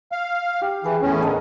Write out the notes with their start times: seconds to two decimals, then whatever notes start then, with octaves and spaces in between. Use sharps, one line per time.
0.12 F5
0.62 G4
0.84 E3 G#4 B4
1.02 E2 A2 C#4
1.22 D3 A#4 D#5 A5